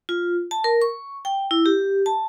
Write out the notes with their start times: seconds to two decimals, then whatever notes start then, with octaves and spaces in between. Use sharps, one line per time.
0.09 F4
0.51 A5
0.64 A#4
0.82 C#6
1.25 G5
1.51 E4
1.66 G4
2.06 A5